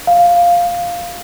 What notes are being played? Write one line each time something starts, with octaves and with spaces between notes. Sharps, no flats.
F5